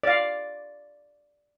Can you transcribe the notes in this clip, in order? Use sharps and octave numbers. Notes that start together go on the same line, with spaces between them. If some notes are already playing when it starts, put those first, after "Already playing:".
D5 F5